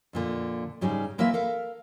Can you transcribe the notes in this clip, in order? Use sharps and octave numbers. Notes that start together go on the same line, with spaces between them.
F2 A#2 D3
G#2 C#3 G3 D#4 G#4
E3 A#3 C4 B4 E5
A4 A#4 F5